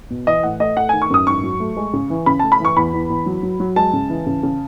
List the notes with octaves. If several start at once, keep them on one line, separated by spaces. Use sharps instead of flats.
B2
E3 D#5
A2 F#5
A3 D#5
A3 F#5
D#3 G#5
C#6
F#2 D#6
G#2 C#6
F#3
A3
G#3
C#3
E3
C#3 B5
A3 A5
B5
E3 C#6
E2 B5
E2
E2
F#3
F#3
F#3
G#3 A5
C#3
E3
C#3
C#3